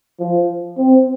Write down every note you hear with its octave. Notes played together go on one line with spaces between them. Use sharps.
F3
C4